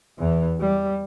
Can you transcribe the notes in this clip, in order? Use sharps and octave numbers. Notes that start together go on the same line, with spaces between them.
E2 E3
G3